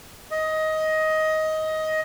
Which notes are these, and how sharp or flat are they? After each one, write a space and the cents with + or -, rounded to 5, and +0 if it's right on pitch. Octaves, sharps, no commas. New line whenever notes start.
D#5 +15